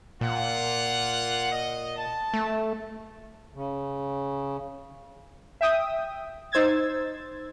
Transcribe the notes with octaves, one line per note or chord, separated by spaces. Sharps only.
A#2 A#3 F4 F#5
D#5
A5
A3
C#3
E5 G5 D#6
D#4 C5 E6 G#6 A6